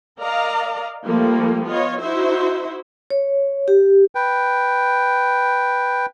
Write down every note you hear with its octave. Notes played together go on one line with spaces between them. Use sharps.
A#4 D5 D#5 F5 A#5
F3 G3 A3 A#3
B3 F4 C#5 D#5
D#4 E4 F#4 C5 E5
C#5
G4
B4 G5